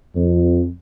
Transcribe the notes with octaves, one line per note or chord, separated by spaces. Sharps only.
F2